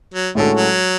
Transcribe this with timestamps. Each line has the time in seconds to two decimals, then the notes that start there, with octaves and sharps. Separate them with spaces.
0.14 F#3
0.35 A2 D3 G#3 C#4 F#4 A4
0.57 F#3